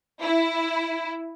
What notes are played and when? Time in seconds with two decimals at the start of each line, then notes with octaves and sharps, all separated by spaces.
0.22 E4